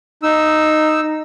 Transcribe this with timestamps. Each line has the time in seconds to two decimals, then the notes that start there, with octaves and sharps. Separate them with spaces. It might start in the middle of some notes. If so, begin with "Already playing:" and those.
0.23 D#4 E6